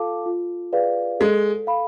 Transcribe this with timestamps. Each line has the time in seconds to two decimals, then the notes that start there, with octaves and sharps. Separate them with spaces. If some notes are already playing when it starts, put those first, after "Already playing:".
Already playing: F4 A4 F5 A5 D6
0.26 F4
0.73 G#4 B4 D5 F5
1.20 G#3 A4
1.67 F5 B5